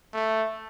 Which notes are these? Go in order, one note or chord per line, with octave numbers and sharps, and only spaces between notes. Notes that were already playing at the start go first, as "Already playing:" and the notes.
A3